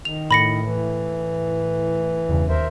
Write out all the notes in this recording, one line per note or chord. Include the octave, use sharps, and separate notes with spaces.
D#3 F7
A2 B5 A#6 C#7
E3
E2 G2 C#3
D#2 A#4 C5 E5